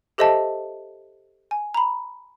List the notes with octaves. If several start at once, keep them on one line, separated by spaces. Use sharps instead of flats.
G4 A4 C5 D#5 E5 A5
G#5
A#5 B5